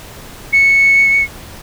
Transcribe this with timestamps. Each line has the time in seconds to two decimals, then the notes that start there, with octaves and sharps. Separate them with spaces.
0.53 C#7